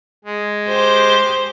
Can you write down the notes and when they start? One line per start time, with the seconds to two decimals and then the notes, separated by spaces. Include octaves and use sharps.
0.24 G#3
0.68 G4 C5